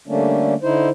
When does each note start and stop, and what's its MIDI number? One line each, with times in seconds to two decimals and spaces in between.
0.07 0.54 50
0.07 0.54 55
0.07 0.54 57
0.07 0.54 58
0.07 0.54 61
0.07 0.54 62
0.63 0.89 50
0.63 0.89 63
0.63 0.89 64
0.63 0.89 72